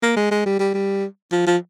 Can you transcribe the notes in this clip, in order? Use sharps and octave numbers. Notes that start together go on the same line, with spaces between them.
A#3
G#3
G#3
G3
G3
G3
F3
F3